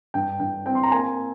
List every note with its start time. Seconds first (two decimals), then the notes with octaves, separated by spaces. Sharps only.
0.14 G2 G5
0.40 G2 G5
0.66 C4 G5
0.75 C6
0.83 A#5
0.92 A#3 G#5